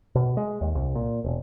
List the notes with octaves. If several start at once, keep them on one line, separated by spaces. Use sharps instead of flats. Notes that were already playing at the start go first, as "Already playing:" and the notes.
B2
G#3
D#2
C2
A#2
E1